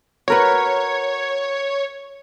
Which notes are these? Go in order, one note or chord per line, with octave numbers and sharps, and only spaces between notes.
F#4 A#4 B4 C#5